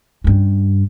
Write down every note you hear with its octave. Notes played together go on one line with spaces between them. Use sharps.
G2 C#4